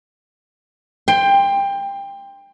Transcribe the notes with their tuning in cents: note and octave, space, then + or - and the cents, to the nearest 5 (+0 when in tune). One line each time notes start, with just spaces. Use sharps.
G5 +20 C6 +0